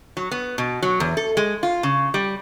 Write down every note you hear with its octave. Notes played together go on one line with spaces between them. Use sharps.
F#3
B3
B2
F#3
E2
A4
G#3
F4
C#3
G3